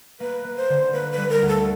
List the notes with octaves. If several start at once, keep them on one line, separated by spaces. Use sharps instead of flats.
A#3 B4
A#3
C5
D3
A#3 B4
B4
G3
A#4
D2
A4